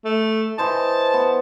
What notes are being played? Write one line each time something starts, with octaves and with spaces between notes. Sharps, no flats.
A3
E3 C5 D#5 A5
B3